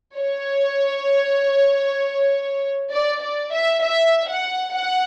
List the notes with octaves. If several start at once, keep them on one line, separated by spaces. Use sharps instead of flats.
C#5
D5
D5
E5
E5
F#5
F#5